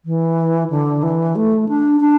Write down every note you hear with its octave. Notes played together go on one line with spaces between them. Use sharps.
E3
D3
E3
A3
D4
D4